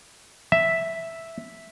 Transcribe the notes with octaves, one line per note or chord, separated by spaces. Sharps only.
E5